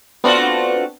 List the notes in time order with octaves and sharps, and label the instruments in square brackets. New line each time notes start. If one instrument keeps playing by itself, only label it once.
[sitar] A3 F4 F#4 [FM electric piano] B3 C4 D4